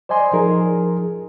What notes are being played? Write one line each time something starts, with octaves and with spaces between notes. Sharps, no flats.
C5 D5 D#5 G#5 C6
F3 D#4 G#4 A#4